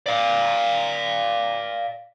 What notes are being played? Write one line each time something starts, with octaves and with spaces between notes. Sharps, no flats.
D5 F5